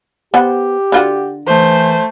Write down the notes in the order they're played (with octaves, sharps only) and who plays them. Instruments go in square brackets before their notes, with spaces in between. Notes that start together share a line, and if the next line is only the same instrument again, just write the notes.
[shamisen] B3 C5 F#5 [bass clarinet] G4
[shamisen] D3 F4 F#4
[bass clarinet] E3 [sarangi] A3 [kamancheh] C5